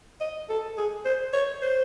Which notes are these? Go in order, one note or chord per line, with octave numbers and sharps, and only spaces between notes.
D#5
A4
G#4
C5
C#5
C5